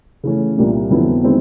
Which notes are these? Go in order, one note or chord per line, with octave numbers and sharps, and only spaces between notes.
C#3 E3 A3 C#4
C2 A#2 G3 A#3 D4
F2 D3 F#3 B3 E4
D#3 G#3 C4 E4